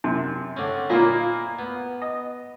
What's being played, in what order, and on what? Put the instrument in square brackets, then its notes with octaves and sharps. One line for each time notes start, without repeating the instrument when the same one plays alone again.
[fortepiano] F#2 C3
[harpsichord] D3 C4 C#4
[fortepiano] A#2 A#3 [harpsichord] E4 C5 D#5 [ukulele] F4
[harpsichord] B3
[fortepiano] D#5